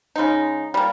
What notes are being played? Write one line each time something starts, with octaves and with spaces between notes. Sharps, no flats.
C#3 G#3 D#4
G3 A#3